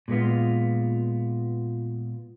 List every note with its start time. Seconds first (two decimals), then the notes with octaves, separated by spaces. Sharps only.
0.08 A#2 G#3 B3 F4